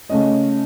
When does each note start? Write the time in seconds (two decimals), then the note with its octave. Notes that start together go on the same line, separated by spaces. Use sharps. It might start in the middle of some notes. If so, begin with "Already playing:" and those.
0.09 C#3 A3 C#4 D#5